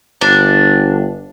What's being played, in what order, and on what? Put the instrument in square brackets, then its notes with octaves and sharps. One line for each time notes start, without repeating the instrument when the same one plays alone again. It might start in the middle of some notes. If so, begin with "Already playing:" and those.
[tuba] G1 [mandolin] D4